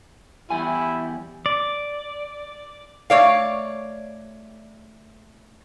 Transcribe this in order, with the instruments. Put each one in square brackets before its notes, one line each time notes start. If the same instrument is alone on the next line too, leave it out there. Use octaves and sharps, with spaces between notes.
[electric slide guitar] E2 G3 G#5 [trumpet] E4
[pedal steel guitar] D5
[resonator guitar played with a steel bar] A3 C#5 D5 F5